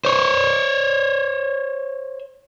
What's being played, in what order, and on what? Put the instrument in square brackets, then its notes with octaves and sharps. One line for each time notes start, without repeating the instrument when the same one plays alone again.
[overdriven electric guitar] C5 C#5